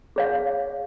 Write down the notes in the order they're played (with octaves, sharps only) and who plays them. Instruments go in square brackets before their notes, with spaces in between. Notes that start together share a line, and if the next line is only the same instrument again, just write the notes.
[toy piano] G#4 C#5 F5